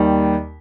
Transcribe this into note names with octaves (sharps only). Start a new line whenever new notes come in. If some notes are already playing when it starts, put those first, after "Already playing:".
Already playing: D#2 D#3 G3